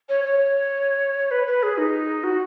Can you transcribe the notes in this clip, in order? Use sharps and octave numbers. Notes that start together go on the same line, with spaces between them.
C#5
C#5
B4
B4
G#4
D#4
F#4